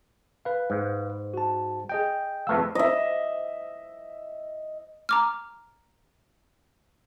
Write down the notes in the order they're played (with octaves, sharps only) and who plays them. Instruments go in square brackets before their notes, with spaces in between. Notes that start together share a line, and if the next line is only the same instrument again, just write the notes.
[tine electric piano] B4 F5
[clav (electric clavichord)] G#2
[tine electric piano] F#4 A5
G#4 D#5 G5
[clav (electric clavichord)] F2 A3 F5 [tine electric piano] B4 E6
[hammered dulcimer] D#5 E5
[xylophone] A#5 D6 F6